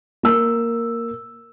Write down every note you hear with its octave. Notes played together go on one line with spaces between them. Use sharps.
A#3 E6